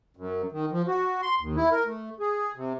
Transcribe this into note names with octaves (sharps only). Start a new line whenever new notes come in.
F#2
D#3
F3
F#4
C6
D#2
E4
A#4
A3
G#4
C3